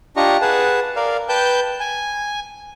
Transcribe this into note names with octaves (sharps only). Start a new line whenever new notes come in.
D4 F4 G4 D#5 A#5 C#6
G#4 B4 F#5 A5
A#4 D5 F5
B4 G5 A5 G6
G#5